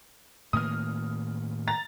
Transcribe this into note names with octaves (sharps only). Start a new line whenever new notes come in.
A2 D#3 A#3 D#6 F6
A#5 A6